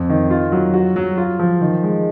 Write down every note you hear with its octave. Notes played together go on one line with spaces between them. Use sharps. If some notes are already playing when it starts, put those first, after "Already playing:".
Already playing: F2
D#3
F4
F#3
F#4
F#3
F4
F3
D#3
G#3